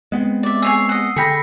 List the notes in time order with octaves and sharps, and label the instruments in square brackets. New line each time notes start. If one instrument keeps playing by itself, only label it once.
[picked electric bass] G#3 B3 C4
[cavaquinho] D5 E5
[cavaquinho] G#4 C#5 G#5 [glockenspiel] E6 C7
[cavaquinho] D#5 F#5
[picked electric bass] D3 [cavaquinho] G#4 G5 B5 [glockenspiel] A#6 B6 C#7